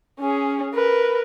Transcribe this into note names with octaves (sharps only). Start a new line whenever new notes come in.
C#4 G#4
A#4 B4